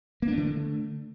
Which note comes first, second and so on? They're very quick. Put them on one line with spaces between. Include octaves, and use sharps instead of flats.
A#3 D4 A3 D3